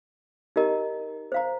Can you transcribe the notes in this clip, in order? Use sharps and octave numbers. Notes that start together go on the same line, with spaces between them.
D#4 G4 A#4 D#5 A#5
C5 F5 A#5